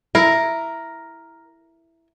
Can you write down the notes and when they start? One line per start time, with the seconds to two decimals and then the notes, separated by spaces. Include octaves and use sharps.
0.15 E4 A#4